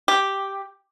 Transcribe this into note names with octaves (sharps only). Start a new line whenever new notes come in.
G4